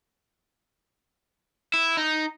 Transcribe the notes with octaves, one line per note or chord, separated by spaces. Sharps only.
E4
D#4